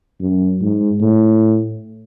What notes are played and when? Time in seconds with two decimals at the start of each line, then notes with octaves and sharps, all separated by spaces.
0.20 F#2
0.61 G#2
1.01 A2